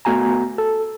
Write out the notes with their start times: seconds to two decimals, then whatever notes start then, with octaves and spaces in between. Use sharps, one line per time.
0.05 A3 B3 F#4 G#5 A#5
0.58 A4